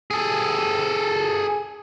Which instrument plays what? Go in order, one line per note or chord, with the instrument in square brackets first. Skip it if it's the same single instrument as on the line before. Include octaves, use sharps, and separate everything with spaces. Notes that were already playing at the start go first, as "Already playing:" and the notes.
[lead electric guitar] G#4 A4